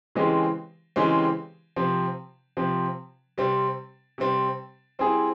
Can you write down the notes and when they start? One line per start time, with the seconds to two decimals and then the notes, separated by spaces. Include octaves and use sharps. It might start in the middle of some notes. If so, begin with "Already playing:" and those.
0.15 C#3 E3 G#3 C4 G4
0.96 C#3 E3 G#3 C4 G4
1.76 C3 F3 C4
2.57 C3 F3 C4
3.38 C3 G3 C4
4.18 C3 G3 C4
4.99 G3 C4 E4 G#4